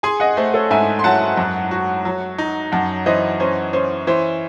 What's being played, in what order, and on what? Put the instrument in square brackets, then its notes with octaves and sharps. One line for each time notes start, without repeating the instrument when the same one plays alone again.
[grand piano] G#4 [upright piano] G#5 C6
[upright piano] D#5 F#5
[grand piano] A3 [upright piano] C5
[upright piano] A4 C#5
[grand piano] G#2 [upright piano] E5 G#5
[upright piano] C6
[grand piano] F#3 [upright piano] F#5 A5
[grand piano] F#2
F#4
F#3
D#4
[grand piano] F#2 [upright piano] F#5 A5
[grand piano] E3 [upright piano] C5 D#5
[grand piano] C#4 [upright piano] C5
[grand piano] C#4 [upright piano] C5
[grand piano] E3 [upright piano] C5